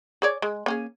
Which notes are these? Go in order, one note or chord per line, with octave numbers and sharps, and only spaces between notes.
G#4 C#5 D5
G#3
A#3 C#4 G#4